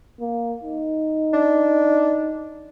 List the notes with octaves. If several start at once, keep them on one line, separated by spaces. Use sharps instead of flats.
A#3
D#4
D4